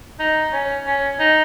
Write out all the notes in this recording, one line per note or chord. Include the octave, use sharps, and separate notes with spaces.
D#4
C#4
C#4
D#4